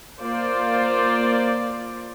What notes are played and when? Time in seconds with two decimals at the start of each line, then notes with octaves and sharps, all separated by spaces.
0.22 A#3 F4 C5 D5